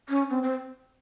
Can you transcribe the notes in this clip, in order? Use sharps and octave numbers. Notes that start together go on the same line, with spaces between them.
C#4
C4
C4